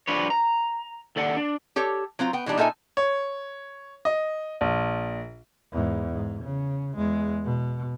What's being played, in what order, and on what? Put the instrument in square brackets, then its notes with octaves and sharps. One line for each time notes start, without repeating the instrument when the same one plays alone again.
[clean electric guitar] F3 G3 D4 B4 C#5
A#5
D#2 A4 D5 F#5
D4
[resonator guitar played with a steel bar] G4 A4 C#5
F#3 C4 F4 A#5
B3 G5
B2 E3 G3 D4 D#4
A#2 D#4 A4 E5 G#5
[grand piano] C#5
D#5
A#1
[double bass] E2 G#2
G#2
C#3
E2 G#3
B2